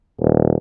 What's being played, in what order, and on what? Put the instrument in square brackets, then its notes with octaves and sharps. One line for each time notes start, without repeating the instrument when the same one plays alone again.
[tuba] D#1